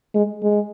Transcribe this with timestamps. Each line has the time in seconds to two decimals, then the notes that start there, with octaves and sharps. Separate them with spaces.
0.14 G#3
0.43 G#3